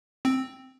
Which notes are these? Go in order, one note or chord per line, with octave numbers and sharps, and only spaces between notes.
C4